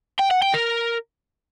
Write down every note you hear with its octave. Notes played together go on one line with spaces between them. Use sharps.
G5
F#5
G5
A#4